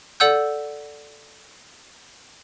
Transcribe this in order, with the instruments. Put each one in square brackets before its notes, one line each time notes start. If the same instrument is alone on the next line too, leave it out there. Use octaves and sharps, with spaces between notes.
[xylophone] A4 D5 F#5 E6 G6